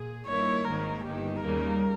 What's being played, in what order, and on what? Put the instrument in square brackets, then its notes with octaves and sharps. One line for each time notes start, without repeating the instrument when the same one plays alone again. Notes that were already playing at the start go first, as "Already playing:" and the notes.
Already playing: [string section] A#2 G#4
[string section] G2 D#3 A#3 E4 [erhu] C#5
[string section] G#1 G#2 D#3 A#3 [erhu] A#4
[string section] G1 G2 D#3 [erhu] G4
[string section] D#2 C#3 G3 A#3 [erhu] A#4